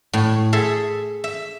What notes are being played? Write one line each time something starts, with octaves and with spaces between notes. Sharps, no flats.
A2
G#4 A4 E5 C6
E5